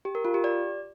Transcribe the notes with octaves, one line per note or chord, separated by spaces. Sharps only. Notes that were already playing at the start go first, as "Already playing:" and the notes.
G4
A#4
F4
G4
D5